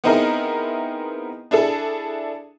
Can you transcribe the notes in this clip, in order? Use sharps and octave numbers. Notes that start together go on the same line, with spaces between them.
B3 C4 D#4 E4 G#4 A#4
D4 E4 G#4 A4